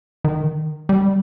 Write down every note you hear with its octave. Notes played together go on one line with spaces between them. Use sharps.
D#3
G3